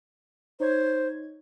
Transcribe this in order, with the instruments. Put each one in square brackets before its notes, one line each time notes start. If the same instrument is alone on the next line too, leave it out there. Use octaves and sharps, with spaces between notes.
[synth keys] D#4 C#5 G#6 [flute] C5